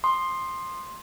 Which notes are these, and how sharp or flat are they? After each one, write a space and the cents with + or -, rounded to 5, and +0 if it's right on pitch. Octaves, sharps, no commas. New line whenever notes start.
C6 +10 D#6 -25